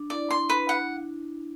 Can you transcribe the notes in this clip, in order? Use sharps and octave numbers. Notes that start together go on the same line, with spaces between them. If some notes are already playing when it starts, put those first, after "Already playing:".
Already playing: D4
E4 D5
C6
B4
F#5